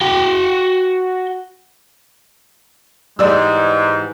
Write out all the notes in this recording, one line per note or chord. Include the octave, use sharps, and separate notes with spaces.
F#4 G5
G#2 E3 G3 G#3 D5 E6